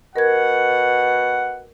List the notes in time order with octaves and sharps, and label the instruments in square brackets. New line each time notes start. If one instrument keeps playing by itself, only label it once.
[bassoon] B2 [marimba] A#4 G#6 [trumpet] F#5